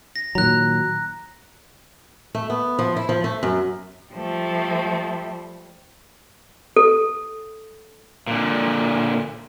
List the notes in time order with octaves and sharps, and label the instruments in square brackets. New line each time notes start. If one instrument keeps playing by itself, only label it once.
[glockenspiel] A#6
[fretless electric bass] A#2 D#3 F#3 [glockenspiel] A#5 F#6
[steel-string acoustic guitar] A3
B3
F3
E4
F3
A3
F#2
[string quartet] F3 G3 A3
[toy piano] A4
[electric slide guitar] A#2 D3